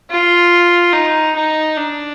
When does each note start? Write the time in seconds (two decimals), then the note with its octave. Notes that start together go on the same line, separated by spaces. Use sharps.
0.10 F4
0.93 D#4
1.35 D#4
1.77 D4